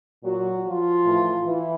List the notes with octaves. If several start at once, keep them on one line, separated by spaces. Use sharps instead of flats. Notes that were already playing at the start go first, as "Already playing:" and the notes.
A#2 F#3 F#4
F3 F4
A2 E3
E3 E4